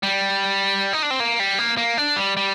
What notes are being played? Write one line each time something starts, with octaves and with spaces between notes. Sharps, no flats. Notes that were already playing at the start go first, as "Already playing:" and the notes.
G3
D#4
D4
C4
A#3
G3
A#3
A#3
D4
G3
G3